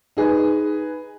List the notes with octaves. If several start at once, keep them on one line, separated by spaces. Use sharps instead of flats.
D#4 G#4 B4